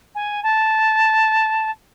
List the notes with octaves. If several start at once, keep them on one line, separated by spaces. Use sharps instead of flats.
G#5
A5